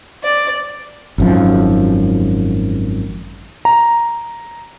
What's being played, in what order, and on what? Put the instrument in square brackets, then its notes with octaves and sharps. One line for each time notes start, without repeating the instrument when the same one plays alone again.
[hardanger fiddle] D5
[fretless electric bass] G#1 F#2 F3
[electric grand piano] A#5